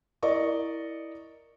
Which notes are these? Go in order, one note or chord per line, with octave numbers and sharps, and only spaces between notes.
E4 A#4 D5 D#5 C#6